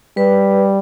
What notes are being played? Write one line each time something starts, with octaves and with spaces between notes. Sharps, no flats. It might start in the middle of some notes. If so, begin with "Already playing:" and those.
G3 B4